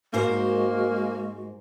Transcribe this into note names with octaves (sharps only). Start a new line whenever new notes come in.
G#2 G#3 A#3 F#4 A#4 C5